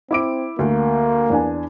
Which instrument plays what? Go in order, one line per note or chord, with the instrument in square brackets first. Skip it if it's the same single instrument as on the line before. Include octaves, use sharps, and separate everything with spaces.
[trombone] C4 [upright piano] E4 D6 D7
[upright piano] D2 [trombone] A#3
[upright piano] E2 D4 G#5